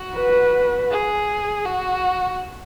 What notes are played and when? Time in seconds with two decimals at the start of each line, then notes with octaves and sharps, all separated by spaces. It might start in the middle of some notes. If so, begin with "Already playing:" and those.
Already playing: F#4
0.16 B4
0.91 G#4
1.65 F#4